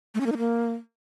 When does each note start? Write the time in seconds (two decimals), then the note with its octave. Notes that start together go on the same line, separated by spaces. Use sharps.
0.15 A3
0.20 C#4
0.26 A#3
0.32 D#4
0.38 A#3